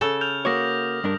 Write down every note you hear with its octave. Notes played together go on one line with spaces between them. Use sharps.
C#3 A4
F6 G6 F7
A#3 F#4 C#5 D6 D#6 A#6
G2 D4 A#4